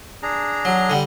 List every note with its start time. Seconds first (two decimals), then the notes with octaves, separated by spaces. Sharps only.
0.23 D4 G#4 A#5
0.65 F#3
0.90 D3 G3